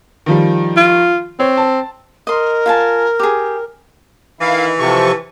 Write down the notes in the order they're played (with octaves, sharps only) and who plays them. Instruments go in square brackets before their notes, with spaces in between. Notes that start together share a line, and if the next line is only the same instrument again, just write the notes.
[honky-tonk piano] D#3 F3 G3
[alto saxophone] F4
[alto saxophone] C4 [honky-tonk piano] C#5
[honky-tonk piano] A5
[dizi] A#4 [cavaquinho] D#5 C6
[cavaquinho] F4 G#5 A5
G4 G#4
[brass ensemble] D#3 E4 [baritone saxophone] E3 [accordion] F5
[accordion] C3 F3 C#6 [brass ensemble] G4 A4